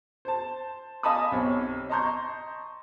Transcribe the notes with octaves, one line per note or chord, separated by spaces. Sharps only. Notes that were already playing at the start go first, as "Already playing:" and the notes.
C5 A5
D#5 F5 G#5 A5 B5 D#6
B1 C4 G4 C#5
D#5 A5 A#5 C6 C#6 G6